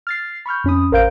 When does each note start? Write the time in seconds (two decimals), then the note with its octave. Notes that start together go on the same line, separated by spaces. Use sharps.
0.07 F6 A6 C7
0.46 B5 C#6 F6 G6
0.64 F2 C#4 B5 D#6
0.92 A1 A#4 C5 F5 G6 D7